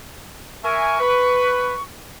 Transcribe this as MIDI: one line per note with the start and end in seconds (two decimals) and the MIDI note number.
0.64 1.00 70
0.64 1.00 76
0.64 1.00 80
0.64 1.83 85
1.00 1.75 71